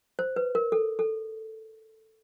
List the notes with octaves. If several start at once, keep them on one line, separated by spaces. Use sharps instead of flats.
C5
B4
A#4
A4
A4